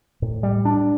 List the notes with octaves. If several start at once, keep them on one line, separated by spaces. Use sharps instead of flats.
A2
G3
D4